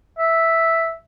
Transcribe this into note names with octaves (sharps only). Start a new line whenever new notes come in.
E5